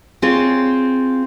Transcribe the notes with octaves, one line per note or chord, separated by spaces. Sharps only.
C4 F4 G#4 C#5